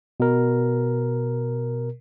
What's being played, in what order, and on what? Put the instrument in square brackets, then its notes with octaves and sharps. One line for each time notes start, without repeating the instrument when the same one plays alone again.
[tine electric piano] B2 A#4